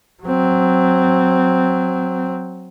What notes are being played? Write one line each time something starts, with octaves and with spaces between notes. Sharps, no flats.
F#3 C4